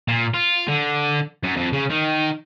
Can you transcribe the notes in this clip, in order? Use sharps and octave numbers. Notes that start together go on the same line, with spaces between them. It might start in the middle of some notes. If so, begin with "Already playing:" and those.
A#2
F4
D3
F#2
F2
C#3
D#3